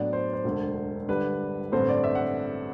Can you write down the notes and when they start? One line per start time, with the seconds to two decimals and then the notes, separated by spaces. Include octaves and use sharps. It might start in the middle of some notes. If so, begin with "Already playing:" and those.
Already playing: A2 F#3 B3 D4 D5
0.13 C5
0.33 C5
0.44 E1 D2 D3
1.08 G1 G2 D3 G3 D4 B4
1.72 A1 G2 D3 A3 C4 C5
1.89 D5
2.04 E5
2.15 F#5